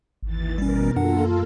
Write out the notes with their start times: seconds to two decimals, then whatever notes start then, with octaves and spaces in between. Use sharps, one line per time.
0.23 G#1 D#2 E3 A6
0.58 B2 G3 C#4 A#4
0.96 F#2 A#3 D4 F4 A4 F#5